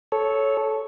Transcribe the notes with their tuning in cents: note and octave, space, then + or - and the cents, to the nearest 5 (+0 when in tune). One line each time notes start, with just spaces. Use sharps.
A4 -15 C#5 +0